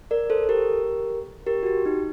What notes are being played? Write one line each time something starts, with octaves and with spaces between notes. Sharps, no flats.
A#4 D5
A4 C5
A4
G4 A#4
G4 A#4
F#4
G4
D#4